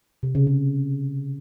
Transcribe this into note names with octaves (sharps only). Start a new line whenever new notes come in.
C3
C#3
C#3